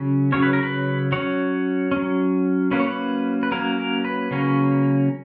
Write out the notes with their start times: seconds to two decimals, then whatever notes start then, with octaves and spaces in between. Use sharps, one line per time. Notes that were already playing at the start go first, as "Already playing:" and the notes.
Already playing: C#3 F#3 C#4
0.32 C#3 F#3 C#4 C#5
0.42 B4
0.53 A#4
0.63 B4
1.12 F#3 C#4 C#5
1.91 F#3 C#4
2.71 F#3 A#3 C#4 B4
2.80 C#5
2.87 B4
3.43 B4
3.52 F#3 A#3 C#4 A#4
3.79 A#4
4.05 B4
4.31 C#3 F#3 A#3 C#4